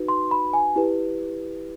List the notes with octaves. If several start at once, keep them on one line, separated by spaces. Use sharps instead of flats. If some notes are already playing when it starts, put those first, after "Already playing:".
Already playing: D#4 F#4 B4
C6
B5
G#5
E4 G4 B4